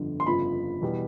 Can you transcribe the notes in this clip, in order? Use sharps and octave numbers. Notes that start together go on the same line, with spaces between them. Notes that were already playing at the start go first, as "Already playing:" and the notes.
Already playing: G1 F2 D3
C6
G1 F2 C#3 F3 B5
E2 B2 G3